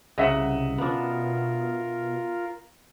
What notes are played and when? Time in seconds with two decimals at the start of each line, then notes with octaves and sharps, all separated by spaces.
0.18 C2 C#3 F#4 A#4 D#5 E5 F#5
0.78 B2 B3 D4 F4 A#4